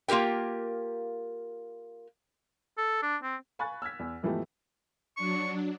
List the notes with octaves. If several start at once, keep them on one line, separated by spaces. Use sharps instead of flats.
A#3 F4 G4 A#4 G5
A4
D4
C4
F5 G#5 B5 C#6 F#6 A6
E6 F6 G#6 B6
E2
G#2 E3 F3 A3 B3 G4
F#3 D4 C#6